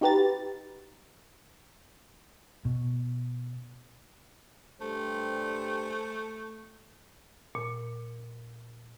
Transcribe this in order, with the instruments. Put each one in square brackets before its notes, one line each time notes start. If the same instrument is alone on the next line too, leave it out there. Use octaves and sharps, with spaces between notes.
[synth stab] D#4 F#4 G4 B4 A#5 A6
[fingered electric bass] B2
[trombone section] G2 G3 C5 [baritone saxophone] A3
[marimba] A#2